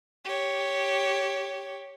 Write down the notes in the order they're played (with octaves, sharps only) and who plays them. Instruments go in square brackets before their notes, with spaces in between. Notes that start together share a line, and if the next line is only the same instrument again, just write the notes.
[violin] G4 C#5